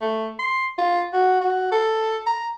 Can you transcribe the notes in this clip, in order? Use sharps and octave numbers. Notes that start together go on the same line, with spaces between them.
A3
C6
F4
F#4
F#4
A4
A#5